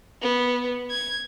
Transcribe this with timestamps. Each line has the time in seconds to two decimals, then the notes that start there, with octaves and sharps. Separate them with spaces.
0.22 B3
0.91 G#6